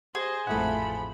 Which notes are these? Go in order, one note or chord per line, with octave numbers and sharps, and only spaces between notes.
G#4 C5 D#5
A1 F2 F3 A3 E4 F#5 B5